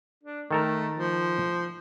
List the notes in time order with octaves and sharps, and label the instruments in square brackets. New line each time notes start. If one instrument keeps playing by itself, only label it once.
[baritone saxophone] D4
[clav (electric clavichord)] D#3 A4 A#4 [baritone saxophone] A3
[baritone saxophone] F3